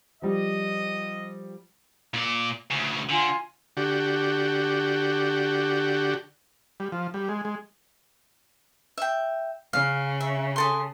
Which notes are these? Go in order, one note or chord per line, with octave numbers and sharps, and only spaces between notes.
F3 G3 D#5
A#2 D5
D2 C#3
D3 F4 G#5
D3 F#4 G4
G3
F3
G3
G#3
G#3
E5 G5
C#3 F5
E5
G#4 A4 C6